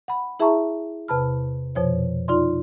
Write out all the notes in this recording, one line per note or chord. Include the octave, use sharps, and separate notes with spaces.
F#5 B5
E4 G#4 E5 A5 A#5 C#6
E2 C3 B4 A5 B5 F6
F2 B2 F3 C5 C#5
D#4 F4 D5 C6